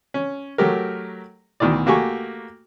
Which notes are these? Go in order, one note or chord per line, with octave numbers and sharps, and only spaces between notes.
C#4
F#3 A3 G4 A#4
D2 B2 D#3 E3 D5
A3 A#3 F#4 G4 G#5 C#6